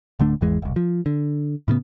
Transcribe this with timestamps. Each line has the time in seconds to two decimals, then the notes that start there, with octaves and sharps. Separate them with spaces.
0.20 D1 D3 A3 D4
0.41 G#1 E2 E3 G#3
0.62 E1 C2
0.76 F3
1.06 D3
1.68 A2 C#3 A3 B3